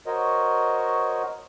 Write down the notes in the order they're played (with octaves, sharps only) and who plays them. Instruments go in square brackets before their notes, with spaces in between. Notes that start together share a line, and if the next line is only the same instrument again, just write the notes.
[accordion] F#4 A#4 C5 C#5 D#5